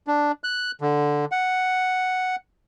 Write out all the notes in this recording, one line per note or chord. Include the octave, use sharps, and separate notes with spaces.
D4
F#6
D3
F#5